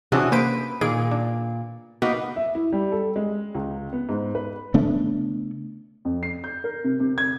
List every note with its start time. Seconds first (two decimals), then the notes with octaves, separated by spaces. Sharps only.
0.12 C3 E3 C#4 D4 F#4 G#4
0.32 A#3 B4 C5 D7
0.81 A#2 D#3 G#4 D7
1.11 D4
2.02 A#3 B3 D#4 F#4
2.36 E5
2.55 E4
2.72 G3
2.92 A4
3.16 G#3
3.55 C#2
3.93 B3
4.09 G#2
4.35 B4
4.74 C#3 A3 B3 D4
6.05 F2
6.23 C7
6.44 G6
6.64 A#4
6.84 C3
7.00 C3
7.18 G#6